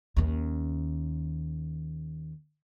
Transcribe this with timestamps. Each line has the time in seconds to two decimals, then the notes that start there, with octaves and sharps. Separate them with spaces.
0.16 D#2 C#4